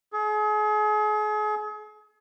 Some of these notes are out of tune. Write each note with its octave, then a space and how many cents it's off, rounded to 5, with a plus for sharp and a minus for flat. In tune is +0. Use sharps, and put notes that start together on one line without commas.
G#4 +35